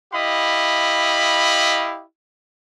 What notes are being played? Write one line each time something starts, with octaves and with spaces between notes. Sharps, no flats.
E4 G4 D#5 F5 B5